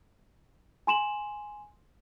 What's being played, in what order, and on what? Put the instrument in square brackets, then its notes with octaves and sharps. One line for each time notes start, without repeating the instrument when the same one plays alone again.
[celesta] G#5 C6 E7 F#7